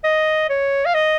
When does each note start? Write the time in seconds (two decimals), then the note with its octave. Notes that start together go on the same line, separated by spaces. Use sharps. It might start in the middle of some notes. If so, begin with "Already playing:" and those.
0.04 D#5
0.49 C#5
0.85 F5
0.94 D#5